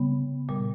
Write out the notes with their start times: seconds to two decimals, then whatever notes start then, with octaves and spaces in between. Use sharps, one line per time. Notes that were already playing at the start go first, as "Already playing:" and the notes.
Already playing: C#3 G3 B3
0.49 A#2 G3